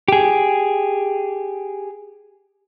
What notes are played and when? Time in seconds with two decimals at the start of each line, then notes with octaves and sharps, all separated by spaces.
0.08 G4 G#4